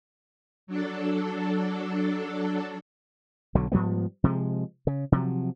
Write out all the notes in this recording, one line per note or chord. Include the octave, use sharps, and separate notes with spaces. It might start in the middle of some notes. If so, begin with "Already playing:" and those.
F#3 D4 A4
B1 D3 F#3
G#2 F3 G3 B3
C3 F3 G#3
C#3
C3 F3 F#3